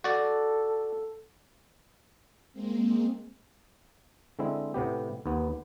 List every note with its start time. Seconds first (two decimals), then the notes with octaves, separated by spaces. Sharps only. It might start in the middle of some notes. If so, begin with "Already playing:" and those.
0.04 F#4 A4 D5
2.53 G#3 A#3 C4
4.39 D3 G#3 C4 E4
4.74 A2 C3 B3 G4
5.26 D#2 B3